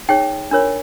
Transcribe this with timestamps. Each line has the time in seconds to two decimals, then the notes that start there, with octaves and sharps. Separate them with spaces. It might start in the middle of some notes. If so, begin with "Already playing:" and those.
0.09 D#4 G#4 C#5 G5
0.51 D4 F4 A#4 C#5